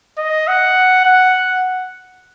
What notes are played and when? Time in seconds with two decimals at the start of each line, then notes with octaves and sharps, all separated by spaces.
0.18 D#5
0.48 F#5
1.05 F#5